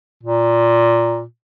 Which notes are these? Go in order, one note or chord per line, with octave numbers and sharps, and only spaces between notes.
A#2